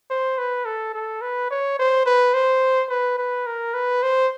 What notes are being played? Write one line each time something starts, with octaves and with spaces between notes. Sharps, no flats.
C5
B4
A4
A4
B4
C#5
C5
B4
C5
B4
B4
A#4
B4
C5